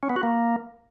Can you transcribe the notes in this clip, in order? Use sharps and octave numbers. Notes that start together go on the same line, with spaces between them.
C#4
B3
F#4
A#3